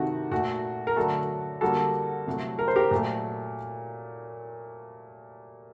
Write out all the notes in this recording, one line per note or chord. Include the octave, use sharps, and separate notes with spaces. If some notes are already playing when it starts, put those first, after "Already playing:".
Already playing: C3 D#3 A3 F#4
A#2 A3 F#4
A#4
D3 F#3 A3 F#4 A4
D3 G3 A#3 F#4 A4
C3 F#3 A3
A#4
C5
G4 A#4
A#2 F#3 A3